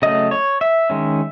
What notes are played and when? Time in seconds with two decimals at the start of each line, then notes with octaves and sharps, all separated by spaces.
0.02 C#3 F#3 A3 D#5
0.31 C#5
0.61 E5
0.90 D#3 G#3 C#4